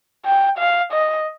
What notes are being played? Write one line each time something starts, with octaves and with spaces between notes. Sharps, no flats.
G5
F5
D#5